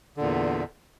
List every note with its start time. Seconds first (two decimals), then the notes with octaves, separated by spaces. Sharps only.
0.17 D3
0.20 A#2
0.22 E2